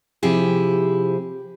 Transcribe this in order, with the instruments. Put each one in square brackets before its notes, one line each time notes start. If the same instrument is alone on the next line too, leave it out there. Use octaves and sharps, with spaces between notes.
[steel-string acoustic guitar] C3 F3 E4 G4 G#4